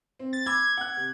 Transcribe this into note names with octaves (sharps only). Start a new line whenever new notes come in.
C4
A6
B5 D6 E6 G#6
F#5 F#6
C3